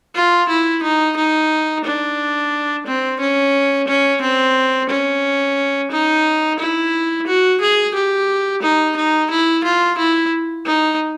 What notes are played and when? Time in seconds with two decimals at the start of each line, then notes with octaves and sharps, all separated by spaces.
0.15 F4
0.49 E4
0.83 D#4
1.17 D#4
1.85 D4
2.86 C4
3.20 C#4
3.88 C#4
4.21 C4
4.89 C#4
5.91 D#4
6.59 E4
7.27 F#4
7.61 G#4
7.94 G4
8.62 D#4
8.96 D#4
9.31 E4
9.64 F4
9.98 E4
10.66 D#4